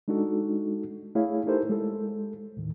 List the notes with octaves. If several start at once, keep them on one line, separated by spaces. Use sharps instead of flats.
G#3 D4 D#4 F#4 A4
A3 E4 G#4 C#5 F5
D#4 E4 G4 A4 A#4 C5
G#3 A4
D#2 A2 D#3